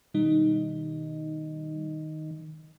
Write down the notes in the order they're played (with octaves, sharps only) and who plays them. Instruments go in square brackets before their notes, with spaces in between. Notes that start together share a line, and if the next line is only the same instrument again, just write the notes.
[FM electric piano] B2 G3 D#4 [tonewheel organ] D#3